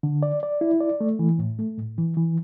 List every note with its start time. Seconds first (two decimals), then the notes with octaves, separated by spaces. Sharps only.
0.03 D3
0.23 D5
0.43 D5
0.61 E4
0.81 D5
1.01 A3
1.19 E3
1.39 A2
1.59 A3
1.78 A2
1.98 E3
2.17 E3